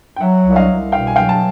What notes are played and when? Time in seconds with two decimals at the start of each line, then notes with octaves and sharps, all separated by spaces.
0.16 G5
0.20 F#3 E5 F#5
0.45 C2
0.53 E5
0.56 D#5 F5
0.69 C2
0.92 B2 F5 G5
1.07 G#5
1.16 F#3 F5 G5
1.29 A5